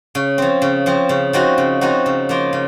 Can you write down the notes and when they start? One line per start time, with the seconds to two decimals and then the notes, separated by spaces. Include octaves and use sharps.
0.15 C#3
0.38 F3 C4
0.62 C#3
0.86 F3 C4
1.09 C#3
1.33 F3 C4 D#4 F#4
1.58 C#3
1.81 F3 C4 D#4 F#4
2.06 C#3
2.29 F3 A#3 F4
2.53 C#3